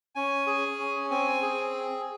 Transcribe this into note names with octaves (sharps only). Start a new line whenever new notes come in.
C#4 G#5
G#4
C#4
C4 G#5
G#4